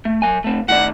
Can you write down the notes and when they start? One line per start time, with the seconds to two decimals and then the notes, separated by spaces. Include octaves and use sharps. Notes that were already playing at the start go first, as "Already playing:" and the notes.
0.05 A3
0.22 F#3 G#5
0.44 A3 C4
0.68 A2 D#3 D5 F#5